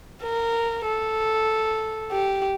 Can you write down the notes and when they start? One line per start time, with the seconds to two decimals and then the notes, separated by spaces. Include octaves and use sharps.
0.23 A#4
0.86 A4
2.12 G4